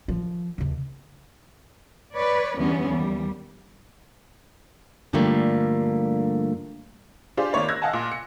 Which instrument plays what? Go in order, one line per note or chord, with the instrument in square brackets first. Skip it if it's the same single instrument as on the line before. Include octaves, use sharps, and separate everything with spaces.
[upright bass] D#3 F3
D#2 C#3
[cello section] B4 C#5 D5
E2 D3 E3 G3 B3 C#4
D#2 G3
[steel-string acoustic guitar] G2 D3 F3 G3 A3 A#3
[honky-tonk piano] D4 F4 G4 G#4 C5 D5
G#1 D#3 A#3 C#5 D5
E6 F#6 G#6 A#6
D#5 F5 F#5 G#5 A5
A#2
C#7